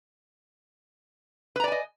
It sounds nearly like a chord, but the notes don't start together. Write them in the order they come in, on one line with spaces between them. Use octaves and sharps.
B4 A#5 D5 G#5 D#5